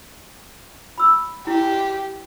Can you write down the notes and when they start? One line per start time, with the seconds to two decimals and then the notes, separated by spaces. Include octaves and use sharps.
0.98 B5 E6
1.47 E4 G4